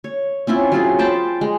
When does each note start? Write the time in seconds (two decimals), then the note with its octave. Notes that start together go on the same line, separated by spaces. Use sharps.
0.04 C#5
0.47 C4 C#4 E4 F4
0.72 F#3 F4 G#4
0.99 C5 G5 A5 B5
1.41 G#3